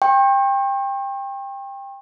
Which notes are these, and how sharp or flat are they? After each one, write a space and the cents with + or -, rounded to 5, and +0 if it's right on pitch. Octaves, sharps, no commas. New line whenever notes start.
G5 +20 C#6 -45